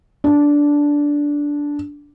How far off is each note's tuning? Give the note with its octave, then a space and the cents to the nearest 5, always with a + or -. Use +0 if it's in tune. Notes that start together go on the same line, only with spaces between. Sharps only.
D4 -10